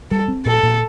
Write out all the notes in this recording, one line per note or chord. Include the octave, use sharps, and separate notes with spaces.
G3 A4
C4
A#2 A4
A#2